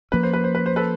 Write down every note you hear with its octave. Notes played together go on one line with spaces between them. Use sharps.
F3 A#3 C#4 B4
C5
B4
C5
B4
C5
A4 B4